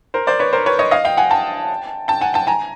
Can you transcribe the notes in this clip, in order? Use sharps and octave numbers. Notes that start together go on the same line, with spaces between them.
A#4 C5
C5 D5
B4 C#5
A#4 C5
B4 C#5
C#5 D#5
D#5 F5
F5 G5
F#5 G#5
G5 A5
G5 A5
F#5 G#5
G5 A5
G#5 A#5